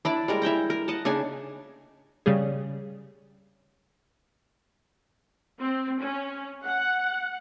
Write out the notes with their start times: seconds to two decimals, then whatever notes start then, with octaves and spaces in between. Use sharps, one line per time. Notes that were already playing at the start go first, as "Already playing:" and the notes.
0.05 D4 E4 D5
0.28 G3 G#3 A#4
0.42 E4 E5 G5 A#5
0.70 A#4
0.88 D#5 F#5 A5
1.05 C#3 D4 D#4 G#5
2.26 C#3 G3 G#4
5.61 C4
6.00 C#4
6.65 F#5